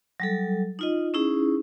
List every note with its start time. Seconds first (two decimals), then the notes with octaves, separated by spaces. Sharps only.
0.20 F#3 G3 A4
0.79 D#4 F4 D#5
1.14 C#4 D#4 E4 G#4